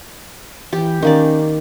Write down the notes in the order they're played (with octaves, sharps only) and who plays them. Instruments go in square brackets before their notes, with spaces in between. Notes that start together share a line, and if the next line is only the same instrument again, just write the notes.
[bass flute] E3 [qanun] G4
[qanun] D#3 A#3 D5 [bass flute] C#4